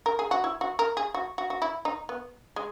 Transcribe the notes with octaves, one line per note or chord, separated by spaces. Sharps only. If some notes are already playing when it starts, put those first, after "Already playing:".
A#4
G#4
F#4
E4
F#4
A#4
G#4
F#4
F#4
F#4
E4
D#4
B3
G#3